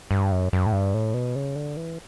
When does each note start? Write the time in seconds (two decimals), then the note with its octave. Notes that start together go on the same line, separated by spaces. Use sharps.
0.11 G2
0.32 F#2
0.53 F#2
0.66 A2
0.72 G2
0.94 A2
1.14 B2
1.35 C#3
1.56 D3
1.77 E3